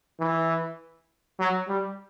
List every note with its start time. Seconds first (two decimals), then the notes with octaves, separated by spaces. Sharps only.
0.20 E3
1.39 F#3
1.68 G3